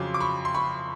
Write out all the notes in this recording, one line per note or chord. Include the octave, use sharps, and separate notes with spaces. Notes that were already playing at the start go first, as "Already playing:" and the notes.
Already playing: F2 C#3 F#3 C6 D6
D6
B5 C#6
C6
B5 C#6